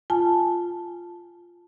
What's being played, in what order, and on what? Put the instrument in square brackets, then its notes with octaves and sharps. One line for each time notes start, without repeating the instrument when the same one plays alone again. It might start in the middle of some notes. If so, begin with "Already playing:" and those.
[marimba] F4 G#5 A5